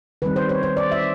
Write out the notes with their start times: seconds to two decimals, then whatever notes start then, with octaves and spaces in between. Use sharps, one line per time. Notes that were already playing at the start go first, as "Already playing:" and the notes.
0.22 D#3 G3 C4 B4
0.36 C5
0.49 C#5
0.63 C5
0.77 D5
0.91 E5